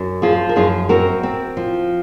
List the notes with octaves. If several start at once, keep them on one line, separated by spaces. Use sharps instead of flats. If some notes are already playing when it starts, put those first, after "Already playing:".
Already playing: F#2
F3 F4 G#4
A#4
F#2 F4 G#4
C4 F#4 A#4
C4
F3